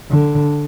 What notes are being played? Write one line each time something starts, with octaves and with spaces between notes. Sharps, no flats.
D3